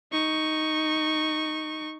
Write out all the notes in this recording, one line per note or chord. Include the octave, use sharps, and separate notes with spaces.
D#4 C#6